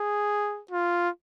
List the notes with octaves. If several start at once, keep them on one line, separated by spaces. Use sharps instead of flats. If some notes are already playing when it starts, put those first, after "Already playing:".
Already playing: G#4
F4